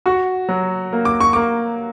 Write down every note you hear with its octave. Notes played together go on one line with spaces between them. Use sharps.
F#4 C#6
F#3
A#3
D6
C#6
A#3 D6